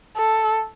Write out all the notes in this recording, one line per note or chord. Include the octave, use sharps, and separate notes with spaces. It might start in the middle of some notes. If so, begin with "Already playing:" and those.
A4